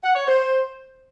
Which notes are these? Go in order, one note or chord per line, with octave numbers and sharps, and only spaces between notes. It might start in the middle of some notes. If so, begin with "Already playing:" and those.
F#5
C#5
C5